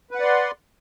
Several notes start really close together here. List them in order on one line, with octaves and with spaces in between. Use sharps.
B4 F#5 D5 C6